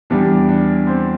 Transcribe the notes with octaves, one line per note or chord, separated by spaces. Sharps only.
E2 E3 G3 D4
D4
C4